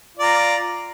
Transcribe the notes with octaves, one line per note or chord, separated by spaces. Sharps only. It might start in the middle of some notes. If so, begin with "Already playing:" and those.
F4 D5 A#5